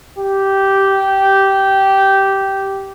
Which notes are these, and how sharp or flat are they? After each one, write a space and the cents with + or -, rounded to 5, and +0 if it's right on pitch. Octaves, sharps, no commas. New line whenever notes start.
G4 -10